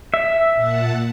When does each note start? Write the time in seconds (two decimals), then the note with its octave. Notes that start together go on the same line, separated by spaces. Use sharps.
0.14 E5
0.54 A#2 F#5 A5